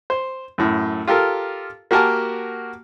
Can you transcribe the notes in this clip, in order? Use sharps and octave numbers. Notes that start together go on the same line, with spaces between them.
C5
F#2 A2
F4 G4 A4 A#4
A#3 F#4 G4 A#4 G#5 A5